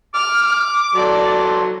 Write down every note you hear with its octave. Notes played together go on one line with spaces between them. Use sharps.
D6 F6
F#3 A4 D5 C6